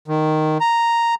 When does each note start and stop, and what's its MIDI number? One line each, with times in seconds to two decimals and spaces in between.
0.08 0.58 51
0.60 1.15 82